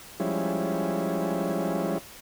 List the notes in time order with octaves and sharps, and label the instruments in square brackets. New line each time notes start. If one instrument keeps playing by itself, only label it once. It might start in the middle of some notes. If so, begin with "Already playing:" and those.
[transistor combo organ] F3 G3 G#3 C#4 E4